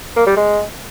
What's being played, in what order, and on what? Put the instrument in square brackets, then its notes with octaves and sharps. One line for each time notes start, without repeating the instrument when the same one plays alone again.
[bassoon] A#3
G3
G#3